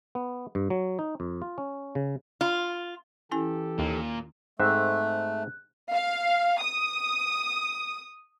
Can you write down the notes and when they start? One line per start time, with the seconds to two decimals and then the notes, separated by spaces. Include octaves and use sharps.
0.15 B3
0.55 G2
0.70 F#3
0.99 D#4
1.20 F2
1.42 F4
1.58 C#4
1.95 C#3
2.41 F4
3.31 E3 C#4 E4 G4 A4 G#5
3.79 D#2 A#2
4.60 G#2 A3 C4 E5 F#6
5.92 F5
6.61 D#6